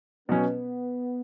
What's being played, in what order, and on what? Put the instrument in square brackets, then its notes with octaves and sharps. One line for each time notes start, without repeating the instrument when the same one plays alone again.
[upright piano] B2 F#3 C#4 [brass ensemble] B3